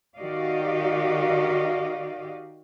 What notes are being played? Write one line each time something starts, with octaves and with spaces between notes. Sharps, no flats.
D#3 F#4 G4 D5 D#5 F5